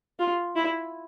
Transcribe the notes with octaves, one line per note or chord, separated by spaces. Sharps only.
F4
E4